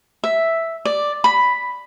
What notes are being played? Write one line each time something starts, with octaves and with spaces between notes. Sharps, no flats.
E5
D5
B5